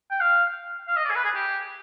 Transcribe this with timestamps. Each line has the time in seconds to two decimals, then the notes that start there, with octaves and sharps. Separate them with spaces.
0.11 G5
0.21 F5
0.88 F5
0.96 D#5
1.06 D5
1.10 G#4
1.16 B4
1.25 G#4
1.35 G4